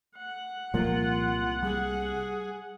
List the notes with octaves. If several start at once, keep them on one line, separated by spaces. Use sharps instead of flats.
F#5
C2 A#2 F3 F#3 A#3 F4
G3 G#4